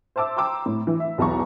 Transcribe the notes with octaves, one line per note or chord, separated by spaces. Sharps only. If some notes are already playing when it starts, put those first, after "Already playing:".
C5 E5 A5 D6 E6
G5 A#5 C6 D6 E6
A2
E3
E5
B1 E2 A5 A#5 C#6